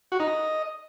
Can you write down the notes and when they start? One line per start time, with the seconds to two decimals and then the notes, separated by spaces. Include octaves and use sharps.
0.12 F#4
0.20 D#4
0.28 D#5